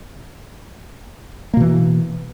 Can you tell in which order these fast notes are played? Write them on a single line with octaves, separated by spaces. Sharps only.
A#3 B2 E3